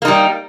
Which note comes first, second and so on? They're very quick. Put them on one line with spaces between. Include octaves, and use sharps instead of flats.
A#3 D#4 G3